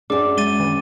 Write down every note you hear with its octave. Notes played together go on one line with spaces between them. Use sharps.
F#2 D4 G#4 D6
G#3 A6 D#7 G7
D#3